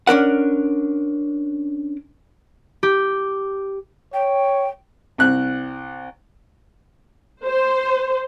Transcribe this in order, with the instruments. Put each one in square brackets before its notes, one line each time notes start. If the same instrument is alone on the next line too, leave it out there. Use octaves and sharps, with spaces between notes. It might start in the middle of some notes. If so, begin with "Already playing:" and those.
[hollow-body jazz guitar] C#4 D4 A#4 F#5
[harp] G4
[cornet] C#5 [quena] G5
[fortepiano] C2 F#6
[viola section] C5